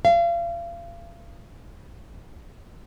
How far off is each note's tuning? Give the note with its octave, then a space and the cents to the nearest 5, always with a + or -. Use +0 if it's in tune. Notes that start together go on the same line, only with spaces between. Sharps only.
F5 -35